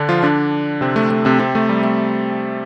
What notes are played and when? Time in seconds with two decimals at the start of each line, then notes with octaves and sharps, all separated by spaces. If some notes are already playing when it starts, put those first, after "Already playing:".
Already playing: D3 D4
0.09 F3 F4
0.23 D3 D4
0.81 C3 C4
0.96 A3
1.11 A3
1.25 C3 C4
1.39 C3 C4
1.55 A3
1.69 G3
1.83 A3